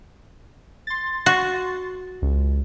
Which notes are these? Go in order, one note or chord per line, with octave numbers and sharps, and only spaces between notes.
C6 A6
F#4
C#2